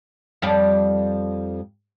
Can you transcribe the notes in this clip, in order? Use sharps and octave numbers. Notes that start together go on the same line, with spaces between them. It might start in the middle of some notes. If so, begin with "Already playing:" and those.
F2 G3 D5